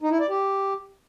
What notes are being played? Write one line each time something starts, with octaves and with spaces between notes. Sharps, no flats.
D#4
E4
D5
G4